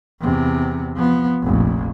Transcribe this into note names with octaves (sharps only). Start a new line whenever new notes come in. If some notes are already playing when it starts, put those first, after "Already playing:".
E2 C3
F3 B3
F1 A#1